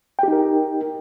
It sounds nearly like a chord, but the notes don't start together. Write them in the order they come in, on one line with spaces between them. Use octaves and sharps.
G5 G4 D#4 A#4